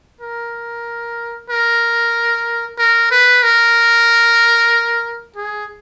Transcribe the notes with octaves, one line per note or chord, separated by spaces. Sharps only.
A#4
A#4
A#4
B4
A#4
G#4